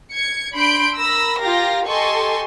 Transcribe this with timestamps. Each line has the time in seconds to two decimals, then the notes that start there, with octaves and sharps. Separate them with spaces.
0.12 G#6 C#7
0.55 D4 B5 C6 G6 D7
0.97 A#4 B5 E6 A#6
1.42 F4 G4 A#4 F5 G5 A#6
1.86 G4 A4 D#5 G#5 C6 C#6